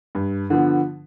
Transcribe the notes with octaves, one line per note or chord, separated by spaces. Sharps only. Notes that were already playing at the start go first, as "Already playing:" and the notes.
G2
D3 F3 B3